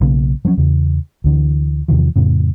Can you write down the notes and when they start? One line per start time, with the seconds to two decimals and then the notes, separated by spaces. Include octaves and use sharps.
0.01 B1 C#3 A#3
0.45 F3 F#3 A3 C#4
0.57 E2 C#3
1.24 D2 D3 E3
1.88 E2 C3 D#3 F3
2.16 F2 A2 C#3